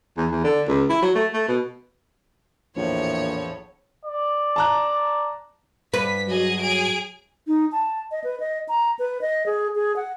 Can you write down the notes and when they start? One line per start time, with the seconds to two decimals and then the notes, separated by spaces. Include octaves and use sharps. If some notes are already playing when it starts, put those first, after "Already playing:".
0.18 E2
0.31 E2
0.44 D3
0.68 C#2
0.89 E4
1.02 F#3
1.15 A3
1.33 A3
1.48 B2
2.76 A#1 E2 A2 F3 C#5
4.05 D5
4.56 A5 A#5 F#6
5.93 G2 B4 B6
6.28 F#3 G#4 D#5
6.59 G#4 D7
7.47 D#4
7.72 A5
8.11 D#5
8.24 B4
8.40 D#5
8.69 A#5
8.99 B4
9.21 D#5
9.46 G#4
9.75 G#4
9.96 F#5